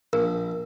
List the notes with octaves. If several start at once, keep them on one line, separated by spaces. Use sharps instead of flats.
A#1 A#4